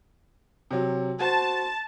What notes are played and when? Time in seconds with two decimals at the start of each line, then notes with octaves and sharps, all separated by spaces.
0.71 C3 F#3
1.20 F#4 C5 A5